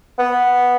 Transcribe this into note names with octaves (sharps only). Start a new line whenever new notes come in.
B3